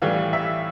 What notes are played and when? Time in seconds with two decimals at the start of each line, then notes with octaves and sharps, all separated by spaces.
0.02 A2 E3 G3 F5
0.33 E5